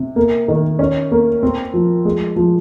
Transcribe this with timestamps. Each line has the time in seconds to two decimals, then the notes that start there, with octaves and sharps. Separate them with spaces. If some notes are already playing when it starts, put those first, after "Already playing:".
Already playing: C3
0.16 A#3
0.48 D#3
0.79 C#4
1.11 A#3
1.43 C4
1.74 F3
2.05 G#3
2.36 F3